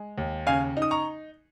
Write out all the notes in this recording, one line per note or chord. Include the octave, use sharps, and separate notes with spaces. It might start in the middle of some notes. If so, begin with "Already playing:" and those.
Already playing: G#3
D#2
C#3 F5 G#5
D#4
D#6
A#5 C#6